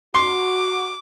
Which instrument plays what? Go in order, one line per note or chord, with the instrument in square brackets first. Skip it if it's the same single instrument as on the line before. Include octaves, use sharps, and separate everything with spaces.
[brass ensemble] F#4 [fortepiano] C6 [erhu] D6